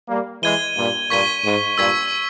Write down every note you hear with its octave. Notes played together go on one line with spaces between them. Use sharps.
G3 A#3
E3 G#3 G#6 D#7 G7
G2 A#2
G2 A#2 C#6 G#6 B6 D#7 G7
G#2
G2 A#2 C#6 E6 G#6 B6 D#7